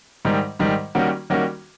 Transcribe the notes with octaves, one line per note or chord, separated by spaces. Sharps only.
G#2 D#3 G3
G#2 D#3 G3
D#3 G3 A#3 C#4 F#4
D#3 G3 A#3 C#4 F#4